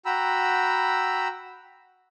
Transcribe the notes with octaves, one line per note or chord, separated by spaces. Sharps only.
F#4 G5 A#5 B5 E6